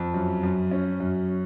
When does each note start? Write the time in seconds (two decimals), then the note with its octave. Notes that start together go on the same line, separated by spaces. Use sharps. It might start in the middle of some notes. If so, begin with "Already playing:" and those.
Already playing: F2
0.14 F#2
0.43 F#2
0.71 C#4
1.00 F#2